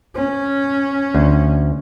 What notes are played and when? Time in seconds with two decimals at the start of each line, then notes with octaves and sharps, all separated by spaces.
0.15 C#4
1.15 D2